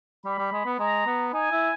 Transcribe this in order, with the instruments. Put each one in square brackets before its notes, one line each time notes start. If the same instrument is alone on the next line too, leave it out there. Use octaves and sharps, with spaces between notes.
[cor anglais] G3 [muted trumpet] B5
[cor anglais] G3
G#3
B3
[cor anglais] G#3 [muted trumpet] A#5
[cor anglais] B3
[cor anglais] D#4 [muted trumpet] G#5
[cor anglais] E4